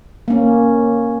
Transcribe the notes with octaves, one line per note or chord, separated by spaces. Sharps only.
A#3 C#4